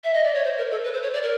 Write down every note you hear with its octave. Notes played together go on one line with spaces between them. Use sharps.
E5
D#5
D5
C#5
C5
A#4
A4
B4
C5
C#5
D5
A#4